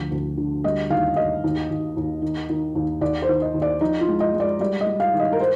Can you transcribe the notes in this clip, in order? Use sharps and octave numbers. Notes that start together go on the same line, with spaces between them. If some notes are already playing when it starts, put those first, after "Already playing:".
Already playing: D2 F3
D2
D3
G3 D#5
D#2 F5
D#3 D#5
D#2
D#2
D#2
D#3
D#3
D#2
D#2 D5
C5
D#3
D#5
D#2
D5
F3 D#4
F4
G#3
D#5
G#3
D5
G3 D5
D#5
G3
F5
D#3
D#5
A#4
C5